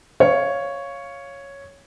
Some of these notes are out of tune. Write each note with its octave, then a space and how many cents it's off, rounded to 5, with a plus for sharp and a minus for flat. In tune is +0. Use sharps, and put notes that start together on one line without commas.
C#5 +0 F5 +0